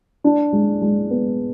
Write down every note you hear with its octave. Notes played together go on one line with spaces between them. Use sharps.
D4
G#3
G#3
B3